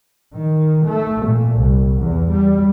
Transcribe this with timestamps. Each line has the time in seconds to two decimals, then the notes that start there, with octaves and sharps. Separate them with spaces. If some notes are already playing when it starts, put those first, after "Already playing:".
0.34 D#3
0.84 A3
1.25 A#2
1.57 C2
1.97 E2
2.31 G3